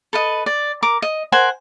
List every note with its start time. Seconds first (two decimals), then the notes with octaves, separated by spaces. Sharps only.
0.13 A4 B4 D#5
0.46 D5
0.83 A#4 D6
1.02 D#5
1.32 A#4 C5 F#5 G#5